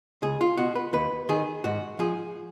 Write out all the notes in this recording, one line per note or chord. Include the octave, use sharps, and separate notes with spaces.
C#2 G#4
F4
B2 F#4
B4
D#2 B4
D#3 G#4
G#2 F#4
F3 G#4